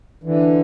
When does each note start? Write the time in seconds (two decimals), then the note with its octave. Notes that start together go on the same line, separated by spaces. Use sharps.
0.24 D3 E3